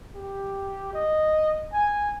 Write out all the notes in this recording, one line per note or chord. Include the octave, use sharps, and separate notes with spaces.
G4
D#5
G#5